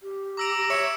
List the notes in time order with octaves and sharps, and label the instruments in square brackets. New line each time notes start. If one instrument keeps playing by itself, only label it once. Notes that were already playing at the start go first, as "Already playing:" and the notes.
[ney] G4
[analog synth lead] A#5 [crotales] D6 E6 D7
[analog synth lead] C#5 [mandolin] E5 [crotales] C#7 E7